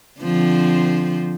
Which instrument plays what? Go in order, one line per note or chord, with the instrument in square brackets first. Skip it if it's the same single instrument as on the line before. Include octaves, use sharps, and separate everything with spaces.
[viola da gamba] D3 F3 C4